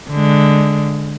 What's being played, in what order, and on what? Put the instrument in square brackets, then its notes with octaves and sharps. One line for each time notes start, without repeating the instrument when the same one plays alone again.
[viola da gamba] D3 G#3